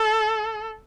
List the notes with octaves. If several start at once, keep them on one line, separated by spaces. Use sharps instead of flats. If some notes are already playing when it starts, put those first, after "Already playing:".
Already playing: A4